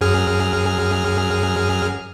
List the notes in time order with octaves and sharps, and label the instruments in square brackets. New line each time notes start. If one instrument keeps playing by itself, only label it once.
[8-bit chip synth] F#2 G#4 F6